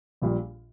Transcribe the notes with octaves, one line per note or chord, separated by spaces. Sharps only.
A#1 A#2 G3